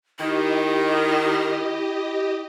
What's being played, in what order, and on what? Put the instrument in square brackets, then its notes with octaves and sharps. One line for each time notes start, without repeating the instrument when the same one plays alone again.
[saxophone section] D#3 [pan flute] E4 [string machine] G4 D#5